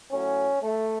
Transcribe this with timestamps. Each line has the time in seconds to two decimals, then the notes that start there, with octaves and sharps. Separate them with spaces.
0.11 A2 F#3 C#4
0.63 A3